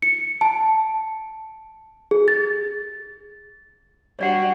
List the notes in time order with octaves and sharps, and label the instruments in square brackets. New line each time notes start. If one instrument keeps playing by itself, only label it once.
[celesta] C#7
A5
G#4
A6
[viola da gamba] G3 D4 F#4 [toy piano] C#5 D5 F#5